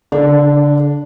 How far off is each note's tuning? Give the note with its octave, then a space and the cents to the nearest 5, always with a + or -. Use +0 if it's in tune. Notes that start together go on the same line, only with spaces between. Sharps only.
D3 -45 D4 +0 A#4 -30